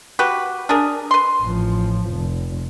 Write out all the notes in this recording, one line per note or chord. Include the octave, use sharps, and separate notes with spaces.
F#4 G4 B4
D4 G#4 A#4
B4 C6
A1 F3
F1